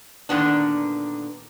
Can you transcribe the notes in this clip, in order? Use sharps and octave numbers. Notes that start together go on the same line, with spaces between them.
A#2 D3 D#3 B3 D4